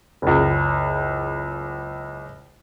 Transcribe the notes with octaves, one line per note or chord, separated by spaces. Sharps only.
F#1 C#2